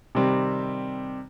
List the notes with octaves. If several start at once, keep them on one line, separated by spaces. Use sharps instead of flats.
C3 D#3 G3 C4